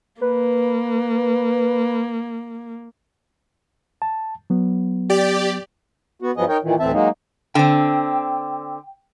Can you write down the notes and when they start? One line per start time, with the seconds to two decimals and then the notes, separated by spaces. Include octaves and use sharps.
0.21 A#3 B4
4.02 A5
4.50 F#3 B3
5.10 G4 D5
6.22 B3 F#4
6.37 G2 F3 F#3 B3 G#4 D#5
6.48 D#4 A#4 C#5 G5
6.63 A#2 D#3 E3
6.80 D2 A2 E3 C4 E5 A5
6.92 F#3 G#3 A#3 D#4
7.55 D3 C4 G5